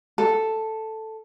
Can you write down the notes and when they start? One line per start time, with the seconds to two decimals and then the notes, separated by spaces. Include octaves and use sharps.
0.18 A4